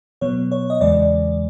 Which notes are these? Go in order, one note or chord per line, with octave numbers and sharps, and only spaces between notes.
B2 F#3 B3 C#5
C#5
D#5
E2 C#3 E3 G#3 D5